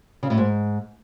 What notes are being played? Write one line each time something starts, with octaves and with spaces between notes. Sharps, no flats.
C#3
A2
G#2